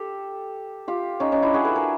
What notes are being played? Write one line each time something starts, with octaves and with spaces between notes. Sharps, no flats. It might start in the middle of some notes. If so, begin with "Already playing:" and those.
Already playing: G4 A4
F4 G4
C#4 D#4
C#4 D#4
D4 E4
F#4 G#4
A4 B4
G#4 A#4